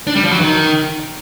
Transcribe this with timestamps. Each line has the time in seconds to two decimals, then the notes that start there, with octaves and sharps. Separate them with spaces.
0.07 D4
0.15 G3
0.24 F3
0.32 F#3
0.40 D#3